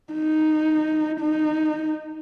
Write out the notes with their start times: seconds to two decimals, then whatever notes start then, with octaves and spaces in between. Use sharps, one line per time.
0.13 D#4
1.20 D#4